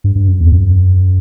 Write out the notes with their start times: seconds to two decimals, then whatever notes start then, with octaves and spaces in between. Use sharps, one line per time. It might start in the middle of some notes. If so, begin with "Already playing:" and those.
0.04 G2
0.15 G2
0.28 F#2
0.41 E2
0.52 F#2